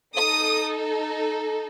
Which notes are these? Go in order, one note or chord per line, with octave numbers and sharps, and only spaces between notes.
D#4 A4 D#6